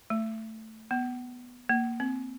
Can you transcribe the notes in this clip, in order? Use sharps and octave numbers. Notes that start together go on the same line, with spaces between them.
A3
B3
A#3
C4